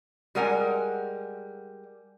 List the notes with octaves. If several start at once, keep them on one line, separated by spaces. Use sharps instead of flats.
G3 G#3 A#4 F#5 G#5